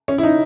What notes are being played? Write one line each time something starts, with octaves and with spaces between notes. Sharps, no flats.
C#4
E4
D#4